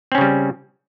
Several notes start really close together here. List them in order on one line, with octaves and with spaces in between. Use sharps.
C4 C#4 C#3 G3